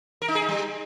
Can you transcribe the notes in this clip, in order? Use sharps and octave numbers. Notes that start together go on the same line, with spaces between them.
A#4
D#4
G#4
D#4
G3